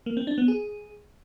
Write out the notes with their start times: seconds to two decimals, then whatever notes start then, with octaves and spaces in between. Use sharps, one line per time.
0.06 A#3
0.17 C4
0.27 D4
0.38 B3
0.48 G#4